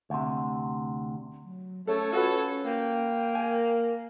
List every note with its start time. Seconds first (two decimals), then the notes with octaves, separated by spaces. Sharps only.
0.10 D2 C3
1.44 F#3
1.87 A3 C#4 A4 C#5
2.12 F4 F#4 A4 B4
2.65 A#3 G5
3.35 A#4 G#5